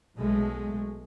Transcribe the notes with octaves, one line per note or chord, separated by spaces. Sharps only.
B1 B2 G#3 A3